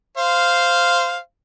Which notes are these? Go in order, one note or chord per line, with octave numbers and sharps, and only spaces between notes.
C5 F5